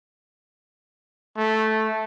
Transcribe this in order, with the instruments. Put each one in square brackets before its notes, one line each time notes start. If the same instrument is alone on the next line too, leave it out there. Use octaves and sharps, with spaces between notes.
[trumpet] A3